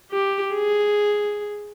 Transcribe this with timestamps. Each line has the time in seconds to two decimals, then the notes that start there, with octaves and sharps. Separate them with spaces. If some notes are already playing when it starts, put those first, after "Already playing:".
0.12 G4
0.54 G#4